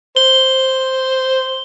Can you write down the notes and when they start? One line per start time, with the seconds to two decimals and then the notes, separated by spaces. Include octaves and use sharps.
0.16 C5 G7